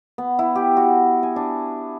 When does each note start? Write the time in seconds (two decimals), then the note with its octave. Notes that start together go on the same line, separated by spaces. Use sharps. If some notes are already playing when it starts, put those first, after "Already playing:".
0.18 B3
0.39 E4
0.55 G4
0.77 F#4
1.23 G#5
1.36 D4